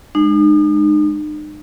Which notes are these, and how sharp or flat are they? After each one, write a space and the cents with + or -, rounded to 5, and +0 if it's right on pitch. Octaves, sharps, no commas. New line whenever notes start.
G#3 +0 D#4 -45